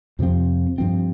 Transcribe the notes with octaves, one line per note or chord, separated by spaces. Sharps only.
F2 C3 F3 C4
G2 F3 C4